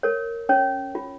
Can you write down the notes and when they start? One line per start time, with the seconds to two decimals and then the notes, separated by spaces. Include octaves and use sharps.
0.03 A#4 C#5
0.49 C#4 C#5
0.95 F4